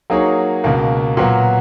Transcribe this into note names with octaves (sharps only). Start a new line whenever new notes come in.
F#3 A#3 D#4 G#4 C#5
C#2 B2 A#3
A#2 F#3 B3 F#4